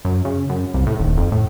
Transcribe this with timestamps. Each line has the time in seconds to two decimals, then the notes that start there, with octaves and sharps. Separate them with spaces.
0.05 F#2
0.25 C#3
0.49 F#2
0.74 C2
0.87 A2
0.99 D#1
1.17 F2
1.32 A2